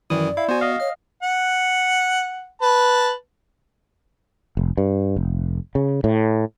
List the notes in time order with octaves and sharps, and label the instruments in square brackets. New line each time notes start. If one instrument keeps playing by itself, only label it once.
[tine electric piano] F#2 D#6 [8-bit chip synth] D#3 E3 E4 [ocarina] D5
[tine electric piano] E4 [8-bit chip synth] F5
[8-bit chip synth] B3 F#4 [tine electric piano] C5 G#5
[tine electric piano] D#5 F5
[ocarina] C#5 [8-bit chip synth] F6
[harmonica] F#5
B4 A5
[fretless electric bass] F1
G2
F1
C#3
A2